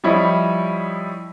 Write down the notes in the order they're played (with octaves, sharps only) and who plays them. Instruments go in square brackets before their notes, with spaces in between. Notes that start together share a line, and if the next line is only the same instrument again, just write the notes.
[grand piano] F3 G3 E4 C#5 D#5